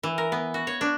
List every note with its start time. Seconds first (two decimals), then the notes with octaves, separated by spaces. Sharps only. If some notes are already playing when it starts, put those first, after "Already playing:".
0.03 E3
0.18 A#4
0.32 B3
0.54 F#4
0.67 C#5
0.81 D4